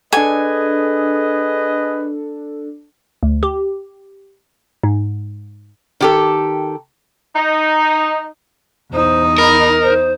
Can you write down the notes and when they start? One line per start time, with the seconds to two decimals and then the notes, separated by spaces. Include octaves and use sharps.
0.12 D4 G#4 A4 B4 D#5 G#5
3.23 D2
3.43 G4
4.84 G#2
6.01 D#3 G4 A4
7.35 D#4
8.92 E2 D#4 C5
9.38 A#4 B5
9.82 C5